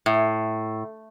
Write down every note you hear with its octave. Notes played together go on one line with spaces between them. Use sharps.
A2